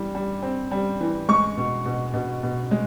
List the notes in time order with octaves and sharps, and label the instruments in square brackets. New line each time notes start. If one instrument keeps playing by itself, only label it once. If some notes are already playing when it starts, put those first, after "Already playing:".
Already playing: [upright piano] E3 G3
G3
C4
G3
E3
G#3 C#6
B2
B2
B2
B2
G#3